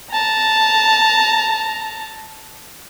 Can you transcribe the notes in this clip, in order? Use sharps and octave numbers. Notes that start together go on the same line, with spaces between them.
A5 A#5